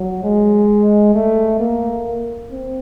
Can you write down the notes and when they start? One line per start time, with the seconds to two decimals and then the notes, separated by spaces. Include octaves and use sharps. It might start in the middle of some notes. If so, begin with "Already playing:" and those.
Already playing: F#3
0.24 G#3
1.14 A3
1.60 A#3
2.51 C4